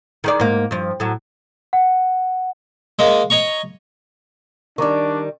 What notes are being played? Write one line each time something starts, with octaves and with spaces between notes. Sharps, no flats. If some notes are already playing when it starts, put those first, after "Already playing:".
D#3 G#4 D5
G#2 A#3
G2 F3
A2 F#3
F#5
G#3 A#3
C#5 D#5 A#5 C#6
D#3 G3 D4 C#6 D6